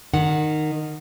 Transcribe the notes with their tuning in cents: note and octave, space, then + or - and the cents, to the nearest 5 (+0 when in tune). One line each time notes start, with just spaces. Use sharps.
D#3 -15 F#5 +0